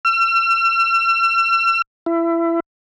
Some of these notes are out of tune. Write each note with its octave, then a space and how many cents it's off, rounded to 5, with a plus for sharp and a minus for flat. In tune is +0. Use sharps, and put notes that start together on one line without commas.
E6 +45
E4 +25